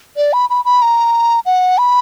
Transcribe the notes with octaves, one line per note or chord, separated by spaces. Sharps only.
D5
B5
B5
B5
A#5
F#5
B5